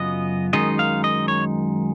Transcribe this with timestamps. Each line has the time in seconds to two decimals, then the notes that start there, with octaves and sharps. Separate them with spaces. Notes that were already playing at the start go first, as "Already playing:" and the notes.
Already playing: F#2 C#3 F#3 B3 F4 D#5
0.53 F#2 D#3 G#3 D#4 D#5
0.79 F5
1.04 D#5
1.28 C#5